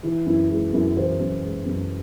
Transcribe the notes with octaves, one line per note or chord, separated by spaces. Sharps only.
E3 E4
F#2 E4
G#3 E4
F#2 E4
E3 C5
F#2
G#3
F#2